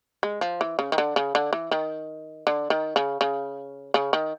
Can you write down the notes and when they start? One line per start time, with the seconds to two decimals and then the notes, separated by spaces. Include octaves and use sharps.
0.23 G#3
0.41 F3
0.61 E3
0.79 C#3
0.92 D#3
0.98 D3
1.16 C#3
1.35 D3
1.53 E3
1.71 D#3
2.47 D3
2.70 D#3
2.96 C#3
3.21 C#3
3.94 C#3
4.13 D#3